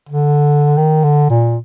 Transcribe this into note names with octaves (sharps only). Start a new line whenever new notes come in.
D3
D#3
D3
A#2